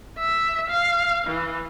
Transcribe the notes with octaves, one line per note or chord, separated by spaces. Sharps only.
E5
F5
E3